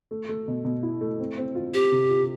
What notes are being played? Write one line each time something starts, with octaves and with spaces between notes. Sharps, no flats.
A3
A3
B2
B2
E4
A3
C4
C4
F4
C4 G4
C3
F4